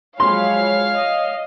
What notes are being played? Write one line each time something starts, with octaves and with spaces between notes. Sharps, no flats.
F3 F#3 G#3 C#5 F5 G#5 B5 C6
D#5